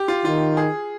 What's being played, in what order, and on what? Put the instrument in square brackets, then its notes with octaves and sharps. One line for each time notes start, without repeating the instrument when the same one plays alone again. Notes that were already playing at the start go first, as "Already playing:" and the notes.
Already playing: [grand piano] G4
F4
[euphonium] D#3 [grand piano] F4
[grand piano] G#4